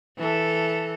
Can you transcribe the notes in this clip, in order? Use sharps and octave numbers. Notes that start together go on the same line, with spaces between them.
E3 A4